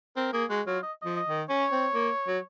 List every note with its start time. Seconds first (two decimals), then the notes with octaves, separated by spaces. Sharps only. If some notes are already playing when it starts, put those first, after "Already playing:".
0.17 C4 A#4
0.33 A#3 G#4
0.50 G#3 F#4
0.67 F#3 F4
0.83 D#5
1.02 F3 D#5
1.16 D#5
1.28 D#3
1.49 C#4 C#5
1.72 C4
1.94 A#3
2.27 F#3